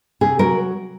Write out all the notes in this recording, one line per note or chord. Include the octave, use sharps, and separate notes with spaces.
C3 G#4
F#3 A#4